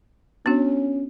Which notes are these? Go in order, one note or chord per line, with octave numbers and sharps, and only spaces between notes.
B3 C#4 D4 F#4